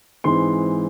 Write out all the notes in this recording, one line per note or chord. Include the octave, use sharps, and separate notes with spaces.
G#2 E3 G#3 C4 C6